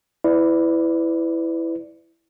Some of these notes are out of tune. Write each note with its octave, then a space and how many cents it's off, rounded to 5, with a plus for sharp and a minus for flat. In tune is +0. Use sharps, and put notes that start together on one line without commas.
E4 +0 B4 +35 D5 +0